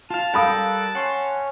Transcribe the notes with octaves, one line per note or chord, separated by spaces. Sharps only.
F4 F5 A5
G3 A4 A#4 F5 G5 B5 D#6 F#6
C#4 C#5 F#5 C6